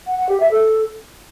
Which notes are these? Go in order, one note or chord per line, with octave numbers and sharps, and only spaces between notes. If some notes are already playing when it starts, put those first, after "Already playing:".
F#5
F#5
G4
E5
A4